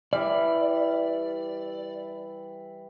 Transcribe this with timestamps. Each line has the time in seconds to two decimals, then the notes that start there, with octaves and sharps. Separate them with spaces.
0.13 E3 G3 D5